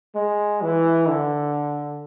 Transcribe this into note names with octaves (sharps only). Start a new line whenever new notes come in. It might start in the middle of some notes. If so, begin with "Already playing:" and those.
G#3
E3
D3